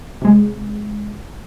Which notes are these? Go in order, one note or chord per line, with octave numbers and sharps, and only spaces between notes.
C3 G#3